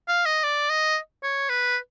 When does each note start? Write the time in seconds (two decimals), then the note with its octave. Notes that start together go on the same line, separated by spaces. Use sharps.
0.08 F5
0.26 D#5
0.44 D5
0.70 D#5
1.23 C#5
1.49 B4